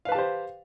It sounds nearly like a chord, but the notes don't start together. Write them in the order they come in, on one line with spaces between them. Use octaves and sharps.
F5 B4 A5 G4 C5